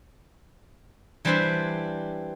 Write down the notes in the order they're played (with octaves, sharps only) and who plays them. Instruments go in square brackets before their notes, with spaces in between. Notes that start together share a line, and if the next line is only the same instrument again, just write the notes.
[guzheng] E3 G3 C4 D4 C5 E5